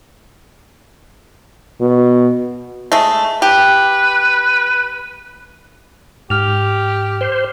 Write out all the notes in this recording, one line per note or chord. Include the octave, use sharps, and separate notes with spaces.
B2
G#3 A3
G4 B4
G#2 G4 F6 F7
C5